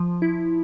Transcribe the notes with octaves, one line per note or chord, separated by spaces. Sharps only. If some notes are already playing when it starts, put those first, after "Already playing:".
Already playing: F3
E4